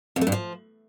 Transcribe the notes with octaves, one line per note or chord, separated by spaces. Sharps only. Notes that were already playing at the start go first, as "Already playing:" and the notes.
F2
A3
G2
F3